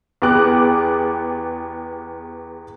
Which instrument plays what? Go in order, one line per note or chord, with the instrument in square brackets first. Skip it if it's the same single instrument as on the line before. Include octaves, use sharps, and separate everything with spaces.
[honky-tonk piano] E2 B3 G4 G#4 D6 F#6